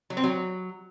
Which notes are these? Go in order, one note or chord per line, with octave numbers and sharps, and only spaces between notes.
F#3
C4
F#3